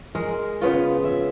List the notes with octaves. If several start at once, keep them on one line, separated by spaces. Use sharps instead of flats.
G#3 A#4
C#3 B3 F4
E5